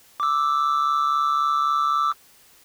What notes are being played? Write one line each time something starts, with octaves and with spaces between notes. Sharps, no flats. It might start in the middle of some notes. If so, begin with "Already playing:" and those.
D6 E6